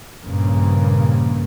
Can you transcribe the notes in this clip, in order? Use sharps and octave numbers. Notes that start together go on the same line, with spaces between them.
A#1 G2 C#3 A#3